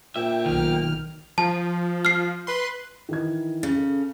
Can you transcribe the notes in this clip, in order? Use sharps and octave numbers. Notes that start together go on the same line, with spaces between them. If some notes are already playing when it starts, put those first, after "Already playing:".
D2 A#2 E5 G5
B1 D#3 F6
F3 A5
F6 C7
B4 C6
D#3 E3 G#6
C#3
A4